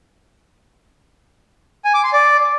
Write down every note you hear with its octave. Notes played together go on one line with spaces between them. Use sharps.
G#5
D6
C6
D5